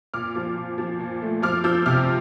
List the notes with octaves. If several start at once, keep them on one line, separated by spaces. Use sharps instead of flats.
A#2 D6 F6
F3
A#2
F3
A#2
A3
F3 D6 F6
F3 E6 G6
C3 D6 F6